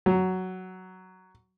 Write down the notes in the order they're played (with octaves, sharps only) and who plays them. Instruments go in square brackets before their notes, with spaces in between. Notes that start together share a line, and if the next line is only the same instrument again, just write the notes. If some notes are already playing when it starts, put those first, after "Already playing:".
[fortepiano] F#3